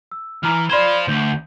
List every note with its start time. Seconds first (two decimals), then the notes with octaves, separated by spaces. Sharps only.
0.11 E6
0.43 E3 A#5 F6
0.69 C5 D5 F5 B5 G#6
1.08 D2 G6